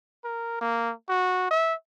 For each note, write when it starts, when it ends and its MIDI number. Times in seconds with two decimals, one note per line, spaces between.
0.24 0.60 70
0.61 0.92 58
1.09 1.47 66
1.51 1.74 76